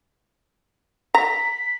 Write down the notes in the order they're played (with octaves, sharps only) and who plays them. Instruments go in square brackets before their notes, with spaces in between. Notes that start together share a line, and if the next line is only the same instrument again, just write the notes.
[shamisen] A#5 [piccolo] B6